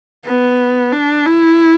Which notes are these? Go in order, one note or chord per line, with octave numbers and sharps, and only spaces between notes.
B3
D4
E4